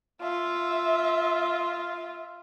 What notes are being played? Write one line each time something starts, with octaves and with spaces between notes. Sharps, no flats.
F4 E5